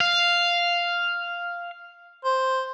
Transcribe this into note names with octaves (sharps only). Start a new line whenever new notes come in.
F5
C5